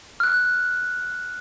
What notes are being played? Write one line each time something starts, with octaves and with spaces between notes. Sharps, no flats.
F6 F#6